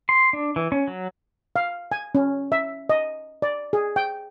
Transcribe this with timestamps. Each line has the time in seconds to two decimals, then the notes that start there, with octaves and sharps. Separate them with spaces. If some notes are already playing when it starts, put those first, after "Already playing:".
0.09 C6
0.33 D4
0.56 E3
0.72 C#4
0.87 F#3
1.56 F5
1.92 G#5
2.15 C#4
2.52 E5
2.89 D#5
3.42 D5
3.73 G#4
3.96 G5